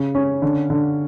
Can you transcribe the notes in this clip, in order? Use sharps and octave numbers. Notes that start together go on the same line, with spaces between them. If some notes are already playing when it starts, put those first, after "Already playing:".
Already playing: C#3
C#4
D3
D3